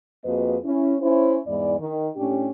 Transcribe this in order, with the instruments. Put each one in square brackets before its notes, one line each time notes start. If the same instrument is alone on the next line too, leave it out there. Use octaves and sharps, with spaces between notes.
[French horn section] F2 A#3 F#4 G#4 B4 D#5
C#4 E4
C#4 E4 C5
E2 G#2 G#3 E4 D5
D#3
A2 C#4 D4 G4